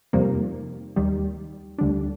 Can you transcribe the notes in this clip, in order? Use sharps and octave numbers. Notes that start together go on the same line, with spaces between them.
F2 C3 D#3 G3 A#3
D#2 D#3 G3
D2 D3 G3 D4